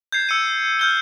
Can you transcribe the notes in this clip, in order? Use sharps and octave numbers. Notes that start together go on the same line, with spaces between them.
G6 G#6 C7
E6 C#7 D#7
F6 G6 G7